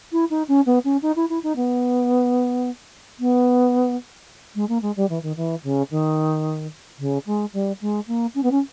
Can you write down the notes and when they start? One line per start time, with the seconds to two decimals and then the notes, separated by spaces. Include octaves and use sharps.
0.12 E4
0.30 D#4
0.48 C#4
0.66 B3
0.84 C#4
1.02 D#4
1.16 E4
1.29 E4
1.43 D#4
1.56 B3
3.19 B3
4.55 G#3
4.68 A#3
4.82 G#3
4.96 G3
5.09 E3
5.23 D#3
5.36 E3
5.64 C#3
5.91 D#3
6.99 C#3
7.26 G#3
7.53 G3
7.81 G#3
8.07 A#3
8.35 C#4
8.43 B3
8.51 C#4